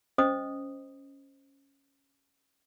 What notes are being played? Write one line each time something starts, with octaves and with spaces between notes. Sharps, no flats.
C#4 C5 D#5 D#6